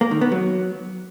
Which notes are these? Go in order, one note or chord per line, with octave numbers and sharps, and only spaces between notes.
A#3
D#3
B3
F#3